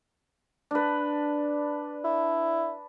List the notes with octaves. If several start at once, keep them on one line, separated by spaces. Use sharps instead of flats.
D4 B4
E4